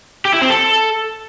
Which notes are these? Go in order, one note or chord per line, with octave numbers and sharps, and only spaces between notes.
G4
E4
C4
A4